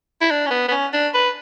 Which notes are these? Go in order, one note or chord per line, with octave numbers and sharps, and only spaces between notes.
E4
D4
C#4
B3
B3
C#4
D4
B4